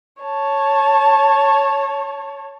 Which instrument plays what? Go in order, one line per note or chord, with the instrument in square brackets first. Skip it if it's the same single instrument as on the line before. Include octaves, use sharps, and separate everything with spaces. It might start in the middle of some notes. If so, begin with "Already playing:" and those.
[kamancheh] C#5 A5